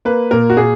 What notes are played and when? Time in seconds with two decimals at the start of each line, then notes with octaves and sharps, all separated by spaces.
0.05 A#3 B4
0.31 A#2 A#4
0.50 F#4
0.57 A#2 G#4